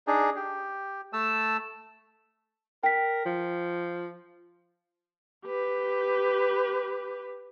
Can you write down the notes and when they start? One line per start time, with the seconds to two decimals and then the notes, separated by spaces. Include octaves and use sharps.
0.07 D4 D#4 G#4
0.36 G4
1.13 A3 A5 E6
2.83 A#4 G5 B6
3.26 F3
5.45 G4 B4